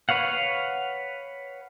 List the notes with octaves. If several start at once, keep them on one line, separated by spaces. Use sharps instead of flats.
B4 C#5 F5 F#5